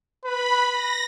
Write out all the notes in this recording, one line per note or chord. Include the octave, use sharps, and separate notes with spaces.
B4 B5
A#6